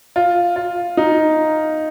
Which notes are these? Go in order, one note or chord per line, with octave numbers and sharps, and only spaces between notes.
F4
F4
D#4